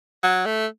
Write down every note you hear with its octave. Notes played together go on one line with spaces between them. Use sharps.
F#3
A3